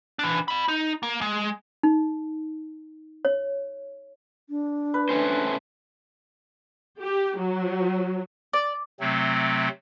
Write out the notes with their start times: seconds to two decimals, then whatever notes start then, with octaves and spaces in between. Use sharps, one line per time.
0.19 E3 D4
0.48 D#5 B5
0.68 D#4
1.03 A#3
1.21 G#3
1.83 D#4
3.25 C#5
4.50 D4
4.94 B4
5.09 A3 C#4 C5
7.00 G4
7.38 F#3
8.53 D5
9.00 C3 F#3 A3 C4